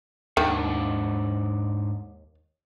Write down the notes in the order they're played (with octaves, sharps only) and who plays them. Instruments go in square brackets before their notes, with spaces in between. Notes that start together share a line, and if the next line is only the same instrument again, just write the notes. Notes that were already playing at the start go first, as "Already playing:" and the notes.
[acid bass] D#2 [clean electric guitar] G#2 D4 F#5 [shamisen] D#3